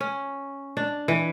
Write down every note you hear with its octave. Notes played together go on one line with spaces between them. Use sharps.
C#4
D4
E3